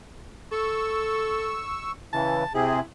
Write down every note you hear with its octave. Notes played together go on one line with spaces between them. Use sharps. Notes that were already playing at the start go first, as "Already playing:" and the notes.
A4 C#6 E6
C#3 E3 A5
C3 C4 E4 G#4